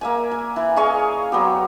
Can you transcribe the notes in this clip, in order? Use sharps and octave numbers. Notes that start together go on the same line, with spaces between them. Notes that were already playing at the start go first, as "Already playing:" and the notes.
A#3 E5 G#5
G#5
E3
G#4 D#5 F5 C#6
F#3 B3 G4